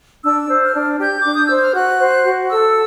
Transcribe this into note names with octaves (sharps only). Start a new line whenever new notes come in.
D4 E6
C5
F6
D4
G4 G6
D6
D4
D#6
C5 E6
F6
F#4 F#6
C5
F#4
A4 E6